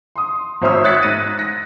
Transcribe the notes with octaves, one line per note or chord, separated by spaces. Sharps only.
C6 D#6
G#1 C5 C#5 E5 D#6 E6
D#6 F#6 G#6 A6 B6 C#7
G#2 A6 A#6 D#7
A#6